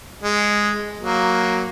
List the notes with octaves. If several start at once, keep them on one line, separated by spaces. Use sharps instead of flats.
G#3
F#3 A#3